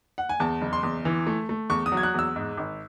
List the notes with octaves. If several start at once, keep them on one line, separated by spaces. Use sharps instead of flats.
F#5
G#5
E2 A5
F#1
C6
E2
E3
A3
A3
E2 C#6
D#6
F#3
G#6
F#6
E2 E6
G#2
G#1